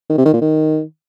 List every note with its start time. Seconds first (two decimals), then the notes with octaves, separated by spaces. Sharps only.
0.09 D#3
0.17 C3
0.25 D#3
0.33 A#2
0.41 D#3